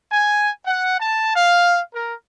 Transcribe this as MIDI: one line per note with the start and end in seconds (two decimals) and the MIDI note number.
0.11 0.48 80
0.65 0.97 78
0.99 1.34 81
1.36 1.79 77
1.93 2.13 70